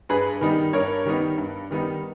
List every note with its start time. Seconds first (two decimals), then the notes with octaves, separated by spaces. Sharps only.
0.09 G2 G#4 B4
0.41 D#3 G3 B3 D#4
0.73 G2 A#4 C#5
1.05 D#3 G3 B3 D#4
1.38 G2
1.71 D#3 G3 B3 D#4